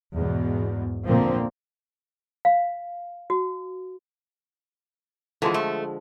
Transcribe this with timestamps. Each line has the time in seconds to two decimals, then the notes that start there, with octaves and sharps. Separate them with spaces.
0.15 E2 G#2 B2
1.07 A#2 D3 F3 A#3 C4
2.45 F5
3.30 F#4
5.42 D3 E3 F3 G#3
5.54 A3